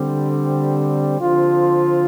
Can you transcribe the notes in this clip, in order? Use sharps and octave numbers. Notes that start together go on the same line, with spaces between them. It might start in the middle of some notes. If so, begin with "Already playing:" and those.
Already playing: D3 G3 C4
D3 F3 C4 F4